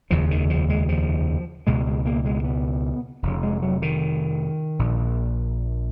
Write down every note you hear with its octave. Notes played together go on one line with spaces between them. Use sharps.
F1 D#2 C#3 F3
D#3
F3
G#3
F3
C#2 B2 G#3
G#3
A#3
G#3
B3
F1 F2 C#3
G#3
F#3
D#3
A#1 A#2